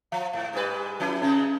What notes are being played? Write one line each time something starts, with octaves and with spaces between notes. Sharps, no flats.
F3 F5
G#2
G#2 G3 B4
F3 C#4 E4
C#3 G#3 C#4 D#4